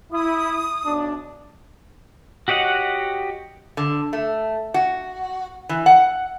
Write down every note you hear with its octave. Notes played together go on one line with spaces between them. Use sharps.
E4 D#6
B1 D4
F#4 G4 C#5 D#5 F#5
D3
A3
F#4
E3
F#5